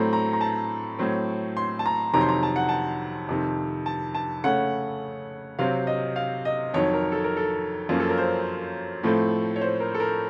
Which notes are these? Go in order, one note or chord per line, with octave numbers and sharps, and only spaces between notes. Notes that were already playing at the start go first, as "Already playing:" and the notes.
Already playing: A2 F#3 A3 C4 A#5
A#5
A#5
A5
A2 F#3 C4
C6
A5
A#5
F2 C3 D#3 F#3 C4 A#5
C6
A#5
A5
F#5
A5
F2 C3 D#3
A5
A5
C#3 A3 C#4 F#5
C3 F#3 C4 F5
D#5
F5
D#5
F2 D#3 F#3 C#5
A#4
A4
A#4
A4
F#2 F3 A#3 C#4
A4
A#4
C5
A2 F3 A3 C4
C#5
C5
A#4
A4
A#4